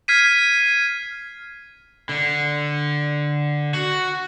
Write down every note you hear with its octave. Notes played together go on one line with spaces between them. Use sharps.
F6 G#6 B6 C7 D#7
D3
F#4